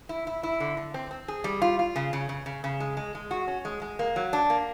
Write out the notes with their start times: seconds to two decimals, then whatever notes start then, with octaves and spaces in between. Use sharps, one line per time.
0.09 E4
0.27 E4
0.43 E4
0.60 D3
0.77 D3
0.94 C4
1.11 C4
1.28 G#4
1.44 G3
1.62 F4
1.79 F4
1.96 C#3
2.13 C#3
2.29 C#3
2.46 C#3
2.64 C#3
2.80 G#3
2.97 G#3
3.15 G#3
3.31 F#4
3.47 C#4
3.65 G#3
3.82 G#3
3.99 A#3
4.16 F#3
4.33 D4
4.50 A#3